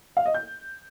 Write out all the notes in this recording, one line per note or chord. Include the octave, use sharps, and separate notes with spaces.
F5
D#5
G6